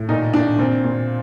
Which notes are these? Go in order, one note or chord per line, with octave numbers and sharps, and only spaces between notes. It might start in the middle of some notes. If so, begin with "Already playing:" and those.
Already playing: A2
A#2 D#4
A#2 D4
A#2 C4
A#2